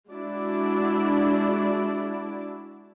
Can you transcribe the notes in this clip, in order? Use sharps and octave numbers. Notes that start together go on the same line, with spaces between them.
G#3 D4 E4 F#4 D5